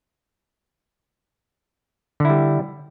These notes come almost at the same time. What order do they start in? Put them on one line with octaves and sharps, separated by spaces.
D3 E4 G3